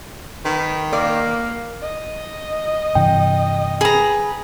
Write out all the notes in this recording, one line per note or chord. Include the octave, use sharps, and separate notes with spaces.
D#3 B4
A#3 D5
D#5
G2 C3 E3 G5
G#4 B4 A#5